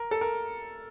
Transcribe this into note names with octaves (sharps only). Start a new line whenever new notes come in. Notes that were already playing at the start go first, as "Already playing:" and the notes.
Already playing: A#4
A4
A#4